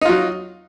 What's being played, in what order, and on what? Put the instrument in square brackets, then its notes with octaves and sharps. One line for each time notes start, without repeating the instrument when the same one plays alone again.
[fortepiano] D#4
F4
F#3